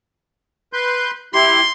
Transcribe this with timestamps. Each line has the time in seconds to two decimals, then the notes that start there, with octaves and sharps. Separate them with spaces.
0.73 B4 C6 G6
1.34 E4 G4 C6